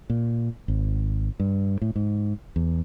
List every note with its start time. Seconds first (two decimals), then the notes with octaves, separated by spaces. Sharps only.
0.10 A#2
0.68 G#1
1.40 G2
1.81 A2
1.96 G#2
2.56 E2